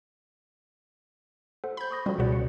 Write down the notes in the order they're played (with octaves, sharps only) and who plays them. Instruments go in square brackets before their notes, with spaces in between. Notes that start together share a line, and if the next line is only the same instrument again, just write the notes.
[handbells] A4 C5 F#5
[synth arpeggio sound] B5 G6
[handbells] C#6 D#6 A#6
[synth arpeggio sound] F3 G3 [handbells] C#4 F#4 A4
[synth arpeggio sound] C#2 B2 F#4 [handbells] G#4 C#5 D5
[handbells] C#7